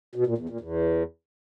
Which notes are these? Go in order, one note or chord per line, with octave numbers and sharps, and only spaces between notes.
B2
A#2
E2
A#2
E2